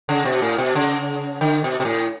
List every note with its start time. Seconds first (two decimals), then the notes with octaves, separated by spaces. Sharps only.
0.09 C#3
0.25 B2
0.42 A2
0.58 B2
0.75 C#3
1.41 D3
1.64 B2
1.80 B2
1.85 A2